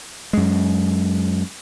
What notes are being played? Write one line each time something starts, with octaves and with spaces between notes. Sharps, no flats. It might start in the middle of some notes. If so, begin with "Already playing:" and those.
F#2 G#3